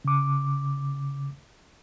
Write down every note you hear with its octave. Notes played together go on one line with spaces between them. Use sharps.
C#3 D6